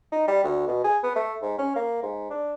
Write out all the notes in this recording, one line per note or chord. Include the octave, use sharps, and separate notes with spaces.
D#4
G3
D2
B2
G#4
B3
A3
G#2
C#4
A#3
G#2
D4